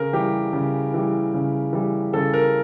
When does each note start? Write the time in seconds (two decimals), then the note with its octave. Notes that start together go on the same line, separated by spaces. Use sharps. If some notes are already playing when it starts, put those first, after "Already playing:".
Already playing: C#3 A#4
0.13 E3 G3 G4
0.53 C#3
0.94 E3 G3
1.34 C#3
1.73 E3 G3
2.13 C#3 A4
2.34 A#4